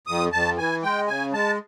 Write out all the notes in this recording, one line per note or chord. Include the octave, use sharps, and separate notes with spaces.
F2 D#6
F2 A5
E3 G#5
G#3 G5
C#3 G#5
G#3 A5